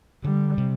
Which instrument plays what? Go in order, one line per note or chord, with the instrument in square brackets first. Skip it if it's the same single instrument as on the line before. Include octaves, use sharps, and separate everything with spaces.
[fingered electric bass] D3 [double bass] G3
[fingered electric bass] C3